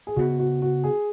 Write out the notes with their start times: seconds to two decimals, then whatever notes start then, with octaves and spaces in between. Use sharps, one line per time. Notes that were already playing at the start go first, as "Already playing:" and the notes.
0.07 G#4
0.16 C#3 B3 F#4
0.39 F#4
0.62 F#4
0.84 G#4